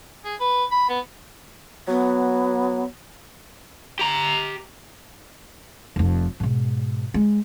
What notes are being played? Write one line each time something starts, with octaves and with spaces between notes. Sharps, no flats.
G#4
B4
B5
B3
F#3 B3
G4 A#5
F1 F2
G#2 B2
G#3